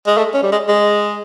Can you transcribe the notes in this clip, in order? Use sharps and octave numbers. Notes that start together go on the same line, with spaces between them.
G#3
A3
C#4
G3
G#3
G#3